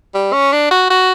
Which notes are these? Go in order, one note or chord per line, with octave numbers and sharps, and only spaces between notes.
G3
C#4
D4
F#4
F#4